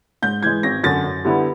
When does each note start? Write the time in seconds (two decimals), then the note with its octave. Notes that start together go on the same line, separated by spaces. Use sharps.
0.22 G#2 G6
0.43 E3 G#3 G#6
0.63 G#1 A#6
0.84 F#2 D3 A6
1.04 F#2
1.24 D3 G3 B3 E4